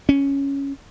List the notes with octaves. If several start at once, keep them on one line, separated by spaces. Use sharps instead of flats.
C#4